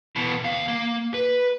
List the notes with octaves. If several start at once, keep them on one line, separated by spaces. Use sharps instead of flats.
B2 E3
D#2 F5
A#3
B4